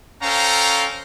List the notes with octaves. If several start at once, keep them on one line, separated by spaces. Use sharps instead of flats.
C#4 A4 C5 F5 G5 A#5